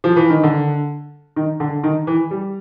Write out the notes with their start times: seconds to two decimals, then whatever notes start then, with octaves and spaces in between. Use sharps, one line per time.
0.04 F3
0.16 E3
0.30 D#3
0.43 D3
1.36 D#3
1.60 D3
1.84 D#3
2.07 E3
2.31 G3